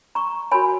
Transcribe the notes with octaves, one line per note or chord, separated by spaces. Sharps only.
A#5 C#6
F#4 A#4 C#5 G#5 B5